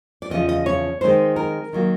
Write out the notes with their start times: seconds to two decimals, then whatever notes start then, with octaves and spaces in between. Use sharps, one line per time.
0.22 D5
0.30 E2 C#3 F3 D#5
0.49 D#5
0.66 C#5
1.01 D#3 G#3 C4 D#4 C5
1.36 A#4
1.73 D#3 F#3 A#3